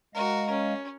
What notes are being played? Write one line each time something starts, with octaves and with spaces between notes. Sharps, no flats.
G#3 F#4 A#4 D#5 F5
C#4